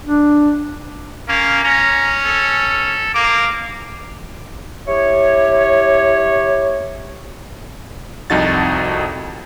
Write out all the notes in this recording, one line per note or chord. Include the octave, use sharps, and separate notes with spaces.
D4
A#3 C#4
C#4 A#5
A4
A#3 D6
E4 G4 C#5
C2 F2 D#4 F#4 A6